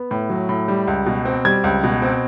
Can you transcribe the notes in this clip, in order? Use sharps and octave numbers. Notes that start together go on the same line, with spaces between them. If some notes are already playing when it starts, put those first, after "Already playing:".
Already playing: B3
A2
F#3
A2
G3
C#2
B2
C4
G3 G#6
C#2
B2
C4